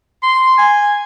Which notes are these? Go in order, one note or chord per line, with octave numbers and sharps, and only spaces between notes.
C6
G#5